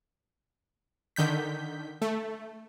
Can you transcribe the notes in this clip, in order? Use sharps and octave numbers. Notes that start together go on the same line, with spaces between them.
D3 D#3 G6 B6
A3